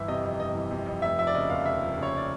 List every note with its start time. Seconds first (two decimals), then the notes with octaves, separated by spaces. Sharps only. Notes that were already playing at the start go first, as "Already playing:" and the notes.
Already playing: G1 E3 E5
0.08 C3 D#5
0.23 F2
0.39 G1 D#5
0.55 E3
0.71 C3
0.86 F2
1.02 F1 E5
1.18 F3 E5
1.27 D5
1.35 C#3 D#5
1.50 D#2 F5
1.66 F1 E5
1.82 F3
1.97 C#3
2.03 C#5
2.17 D5